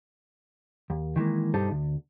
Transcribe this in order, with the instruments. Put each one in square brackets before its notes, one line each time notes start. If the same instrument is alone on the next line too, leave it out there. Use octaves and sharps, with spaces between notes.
[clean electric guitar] D#2
D#3 E3 G#3 A#3
B1 G2 G3 D#4 A4 C5
D2